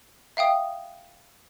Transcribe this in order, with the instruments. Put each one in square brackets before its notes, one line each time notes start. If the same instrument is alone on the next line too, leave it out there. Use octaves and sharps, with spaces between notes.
[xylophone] E5 F5 G5 D#6